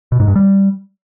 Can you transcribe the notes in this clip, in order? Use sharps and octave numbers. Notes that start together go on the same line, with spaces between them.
B2
G#2
G2
G3